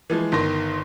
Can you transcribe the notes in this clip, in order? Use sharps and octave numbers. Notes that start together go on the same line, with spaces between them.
E3 F3 G#3
G1 D#3 C6 A#6